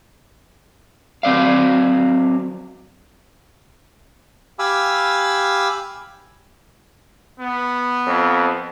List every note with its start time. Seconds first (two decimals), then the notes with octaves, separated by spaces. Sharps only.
1.23 F#3 C4 D5 F5
4.59 G4 F5 G#5 B5 D6 E6
7.39 B3
8.07 F2